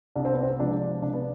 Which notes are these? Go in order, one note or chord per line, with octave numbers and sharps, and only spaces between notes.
C2 D4
C4
B3
C4
C3 F3 G#3 D4
C2 D4
B3